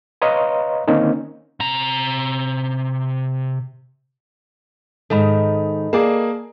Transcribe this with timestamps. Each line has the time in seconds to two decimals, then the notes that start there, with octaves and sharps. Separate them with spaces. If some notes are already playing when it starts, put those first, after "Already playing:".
0.22 B4 C#5 D#5 F5 A#5 C6
0.88 D3 D#3 A#3 C4 C#4 D#4
1.60 C3 A#5
5.10 G#2 D#3 A4 D#5 B5
5.93 A#3 G#4 D5 A5